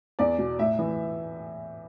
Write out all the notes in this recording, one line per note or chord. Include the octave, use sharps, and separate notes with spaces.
E2 D5
B2
A2 E5
E3